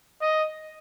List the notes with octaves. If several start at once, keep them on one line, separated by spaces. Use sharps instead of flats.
D#5